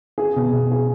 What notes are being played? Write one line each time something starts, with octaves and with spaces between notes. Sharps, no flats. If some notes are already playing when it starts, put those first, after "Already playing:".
G#4
B2
B2
G#4